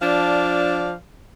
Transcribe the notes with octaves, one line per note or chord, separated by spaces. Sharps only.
F3 D4 D5 F5